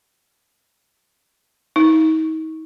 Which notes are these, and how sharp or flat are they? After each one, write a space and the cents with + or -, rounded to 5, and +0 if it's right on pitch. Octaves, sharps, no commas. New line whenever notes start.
D#4 +35